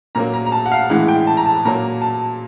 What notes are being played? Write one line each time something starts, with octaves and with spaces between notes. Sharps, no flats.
A#2 F#3 A#3 A#5
A#5
A#5
A5
F#5
F5
A2 E3 G#3 F#5
G5
A5
A#5
A5
A#2 F#3 A#3 A#5
A5